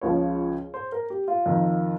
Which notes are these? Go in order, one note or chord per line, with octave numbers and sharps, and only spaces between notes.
C#2 C#3 F3 C#5
C5
A#4
G4
F4
F2 D#3